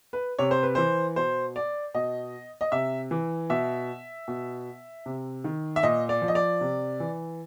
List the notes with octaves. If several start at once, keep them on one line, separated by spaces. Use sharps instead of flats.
B4
C3 C#5
C5
B4
E3 C5
B2 C5
D5
B2 D#5
D#5
C3 E5
E3
B2 E5
B2
C3
D#3
E5
A#2 D#5
D5
F3
D#5
D5
C3
E3